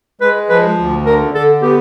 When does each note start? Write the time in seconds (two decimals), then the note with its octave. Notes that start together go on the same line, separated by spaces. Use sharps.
0.21 G#3 B4
0.49 F3 B4
0.78 D2
1.06 D3 A#4
1.34 D3 A4
1.62 B3 G4